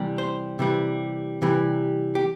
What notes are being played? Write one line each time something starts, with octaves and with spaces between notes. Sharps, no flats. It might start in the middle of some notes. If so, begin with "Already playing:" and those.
Already playing: C3 E3 G3
C5
C3 E3 G3
C3 E3 G3
G4